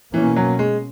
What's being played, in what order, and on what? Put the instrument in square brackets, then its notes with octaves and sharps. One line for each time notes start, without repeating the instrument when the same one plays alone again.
[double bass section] B2 A#3 C#4 [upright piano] E3
[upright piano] F#3
G#3